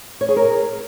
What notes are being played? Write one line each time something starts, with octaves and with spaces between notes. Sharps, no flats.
C#5
G#4
A#4